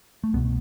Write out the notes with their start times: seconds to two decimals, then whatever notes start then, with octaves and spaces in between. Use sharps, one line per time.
0.24 A3
0.34 C2 B2 B3